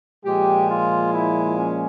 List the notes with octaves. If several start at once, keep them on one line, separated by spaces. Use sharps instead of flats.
A#2 F3 G#3 G4
F4
E4
C#4